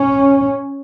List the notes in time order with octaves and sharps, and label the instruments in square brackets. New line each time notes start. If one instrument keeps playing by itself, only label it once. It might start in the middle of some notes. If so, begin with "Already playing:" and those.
Already playing: [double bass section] C#4